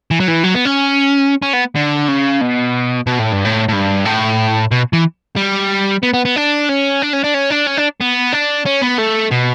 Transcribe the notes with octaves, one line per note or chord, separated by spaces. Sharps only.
E3
F#3
E3
F#3
B3
C#4
C#4
B3
D3
C#3
B2
B2
A2
G2
A2
A2
G2
A2
B2
E3
G3
B3
B3
B3
D4
C#4
D4
C#4
D4
C#4
D4
C#4
D4
B3
D4
C#4
B3
A3
B2